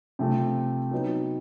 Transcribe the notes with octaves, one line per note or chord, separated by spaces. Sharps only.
C3 F3 A3
F#3 B3 D#4